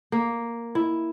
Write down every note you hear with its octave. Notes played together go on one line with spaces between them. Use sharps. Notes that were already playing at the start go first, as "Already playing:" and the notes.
A#3
E4